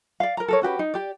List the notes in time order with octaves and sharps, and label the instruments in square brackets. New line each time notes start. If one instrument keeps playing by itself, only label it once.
[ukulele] D5 F5
A#4 A#5
A4 A#4 C#5
C#4 F#4 G4 B4
D#4
G4 D5